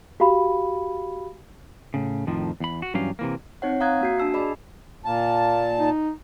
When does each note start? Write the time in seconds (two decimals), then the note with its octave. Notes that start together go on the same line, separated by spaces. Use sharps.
0.20 F#4 G4 F5 B5
1.94 A2 C#3
2.27 F2 A2 D#3 F3
2.60 E2 B5
2.82 F#4
2.94 G2 E3 F#3 C#4 G4 F5
3.19 C3 E3 A#3
3.62 C4 D#4 C#5 F#5
3.80 F5 A#5 D#6 F#6 G#6
4.01 A#3 F#4 C7
4.18 D4 A5 E6 C7
4.34 G#4 D5 D#5 B5
5.05 A#2 A#3 A5
5.79 D#4